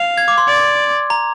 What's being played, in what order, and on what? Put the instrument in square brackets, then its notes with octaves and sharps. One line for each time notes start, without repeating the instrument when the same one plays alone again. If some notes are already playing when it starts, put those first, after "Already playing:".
Already playing: [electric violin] F5
[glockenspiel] G#6
D6
C6
[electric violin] D5
[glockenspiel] A#5